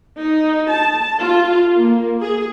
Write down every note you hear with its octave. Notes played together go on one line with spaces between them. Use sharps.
D#4
A5
F4
A#3
G#4